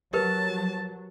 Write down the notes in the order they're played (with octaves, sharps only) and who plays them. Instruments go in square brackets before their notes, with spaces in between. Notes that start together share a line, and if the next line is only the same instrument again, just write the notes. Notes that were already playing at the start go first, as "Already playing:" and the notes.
[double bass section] F#3 [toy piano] G4 A#4 B4 [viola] A5